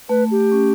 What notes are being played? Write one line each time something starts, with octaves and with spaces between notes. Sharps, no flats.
A3 B4
G4
C#4